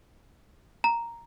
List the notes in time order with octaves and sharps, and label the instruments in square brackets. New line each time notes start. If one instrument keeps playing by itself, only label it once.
[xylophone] A#5